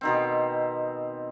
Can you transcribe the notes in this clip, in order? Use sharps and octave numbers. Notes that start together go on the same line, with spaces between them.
B2 D#3 C4